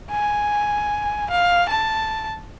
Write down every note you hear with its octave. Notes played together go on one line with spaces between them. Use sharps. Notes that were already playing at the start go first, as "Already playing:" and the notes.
G#5
F5
A5